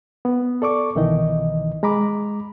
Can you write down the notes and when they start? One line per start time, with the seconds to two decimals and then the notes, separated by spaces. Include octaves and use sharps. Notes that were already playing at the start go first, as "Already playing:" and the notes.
0.25 B3
0.62 A4 D5 C#6 D6
0.95 C2 B2 D#3 E3 D#4 D#5
1.83 G#3 A#5 B5 D6